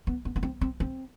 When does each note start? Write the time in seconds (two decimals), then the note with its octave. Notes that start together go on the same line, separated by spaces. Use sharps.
0.07 B3
0.25 B3
0.36 B3
0.43 C4
0.61 C4
0.80 C4